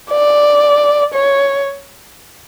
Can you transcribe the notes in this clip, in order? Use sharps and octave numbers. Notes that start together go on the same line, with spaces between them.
D5
C#5